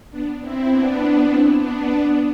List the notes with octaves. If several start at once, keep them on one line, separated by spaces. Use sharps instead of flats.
B3 D4
C4 E4
B3 D4
C4 E4
B3 D4
B3 D4